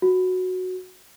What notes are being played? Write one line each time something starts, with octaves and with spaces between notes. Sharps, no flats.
F#4